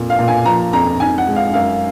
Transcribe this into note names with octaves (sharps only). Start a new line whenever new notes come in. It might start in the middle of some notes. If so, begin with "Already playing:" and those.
Already playing: F2 A#2
F5
A#2
G#5
F3 A#5
F2 A#5
G#2 G#5
F#5
G#3
F5
F#2 F5